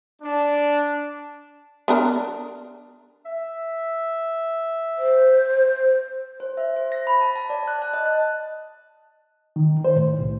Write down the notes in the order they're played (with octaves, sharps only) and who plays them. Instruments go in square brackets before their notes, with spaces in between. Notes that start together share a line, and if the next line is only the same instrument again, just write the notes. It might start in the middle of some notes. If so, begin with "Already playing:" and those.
[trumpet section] D4
[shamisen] B3 D4 A#4
[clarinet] E5
[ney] C5
[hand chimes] C5
E5
C5
A#6
B5
A5
A5
D5
F#6
A5
D#5
F#6
[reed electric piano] D#3
C5
A2
C2